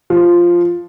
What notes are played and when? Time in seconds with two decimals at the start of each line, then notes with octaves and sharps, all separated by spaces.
0.10 F3